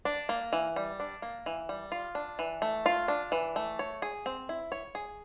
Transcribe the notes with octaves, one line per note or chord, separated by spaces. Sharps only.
D4
A#3
E3
G3
D4
A#3
E3
G3
F4
D4
E3
A3
F4
D4
E3
A3
C#5
G#4
C4
E4
C#5
G#4